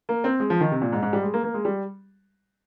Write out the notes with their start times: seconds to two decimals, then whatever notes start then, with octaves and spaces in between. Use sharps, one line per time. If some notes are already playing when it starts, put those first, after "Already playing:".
0.09 A#3
0.24 C4
0.40 G#3
0.50 F3
0.61 D#3
0.72 C3
0.82 A#2
0.92 G#2
1.03 G#2
1.13 G3
1.23 G#3
1.34 A#3
1.44 A#3
1.54 G#3
1.65 G3